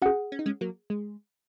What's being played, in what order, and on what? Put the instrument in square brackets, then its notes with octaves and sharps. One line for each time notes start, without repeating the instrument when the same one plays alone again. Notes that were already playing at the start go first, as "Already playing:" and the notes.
[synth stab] C#4 F#4 [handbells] G#4 F#5
[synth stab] C#4
D#4
G#3 C#4
F#3 A#3
G#3